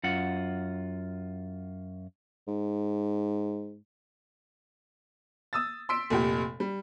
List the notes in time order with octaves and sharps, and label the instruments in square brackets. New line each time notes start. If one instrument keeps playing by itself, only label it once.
[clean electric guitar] F#2 F4 F#5
[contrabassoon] G#2
[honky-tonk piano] D#6 E6 A6
C6 E6 B6 D7
F1 A#2 G4
G3